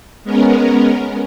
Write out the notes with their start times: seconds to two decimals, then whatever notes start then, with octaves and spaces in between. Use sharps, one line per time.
0.24 G#3 B3 C#4 A#4